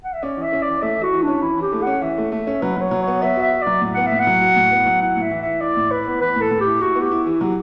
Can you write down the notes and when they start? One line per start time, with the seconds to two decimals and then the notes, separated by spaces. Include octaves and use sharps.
0.04 F#5
0.13 E5
0.23 C#4 D5
0.37 E3
0.42 E5
0.53 C#4
0.62 D5
0.67 E3
0.82 A3 E5
0.97 E3
1.03 F#4
1.13 E3
1.23 C#4 D4
1.42 E3 E4
1.58 E3 G4
1.72 A3
1.82 C#4 F#5
2.02 E3 E5
2.18 A3
2.32 A3 E5
2.47 C#4
2.62 F#3 B4
2.76 F#3
2.82 C#5
2.91 F#3
3.02 C#5
3.07 B3
3.22 B3 E5
3.37 F#4 E5
3.52 F#4
3.62 F#3 D5
3.81 A2
3.94 B3 F#5
4.07 E5
4.12 A2
4.20 F#5
4.27 F#3
4.42 F#4
4.56 A2
4.72 B3
4.86 F#3
5.02 E4 F#5
5.17 A2 E5
5.31 E3
5.42 E3 E5
5.61 E4 D5
5.77 A2
5.91 E4 B4
6.07 B3
6.21 E3 B4
6.36 A2 A4
6.51 A2
6.61 G4
6.66 E4
6.81 E4 F#4
6.96 B3
7.01 G4
7.11 E4
7.26 E3
7.40 F#3 G4